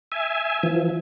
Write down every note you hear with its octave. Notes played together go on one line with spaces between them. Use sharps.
E5 G#5
E3 F3